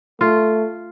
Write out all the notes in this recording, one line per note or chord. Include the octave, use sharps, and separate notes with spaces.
A3 F4